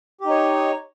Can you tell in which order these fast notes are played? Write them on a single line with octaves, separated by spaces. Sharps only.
G4 D#4 C#5